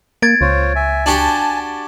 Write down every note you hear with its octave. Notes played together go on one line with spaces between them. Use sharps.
A#3 G#6 A6 D7
C#2 F4 C5 C#5
E5 G#5
D4 F#4 G4 G#5 A5